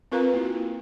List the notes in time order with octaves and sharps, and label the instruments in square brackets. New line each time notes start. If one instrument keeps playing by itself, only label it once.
[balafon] C4 F4 A#4 B4 F5 A#5
A#3 E4 F#4